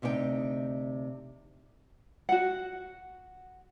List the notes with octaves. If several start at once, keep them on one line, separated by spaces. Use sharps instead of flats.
D2 C3 D#4 B4 G5
F#4 F#5